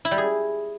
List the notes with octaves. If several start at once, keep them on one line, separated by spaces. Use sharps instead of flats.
E4
G3
G#4